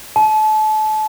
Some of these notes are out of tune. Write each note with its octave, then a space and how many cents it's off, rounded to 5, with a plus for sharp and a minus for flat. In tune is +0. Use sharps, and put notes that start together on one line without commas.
A5 -30